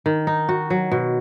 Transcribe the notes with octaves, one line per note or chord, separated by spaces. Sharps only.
D#3
D#4
F#4
F#3
B2